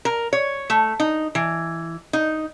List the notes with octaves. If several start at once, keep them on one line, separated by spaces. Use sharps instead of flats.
A#4
C#5
A3
D#4
E3
D#4